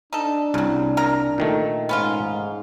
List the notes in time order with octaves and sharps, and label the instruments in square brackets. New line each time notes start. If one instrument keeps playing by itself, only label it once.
[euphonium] D4 [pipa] D#4 A4
[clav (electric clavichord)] C2 [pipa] C#3 F#3
[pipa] C#3 A#4 A#5
[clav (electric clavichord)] A#2 D#3 A3
[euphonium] G#2 [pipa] B3 C#4 F4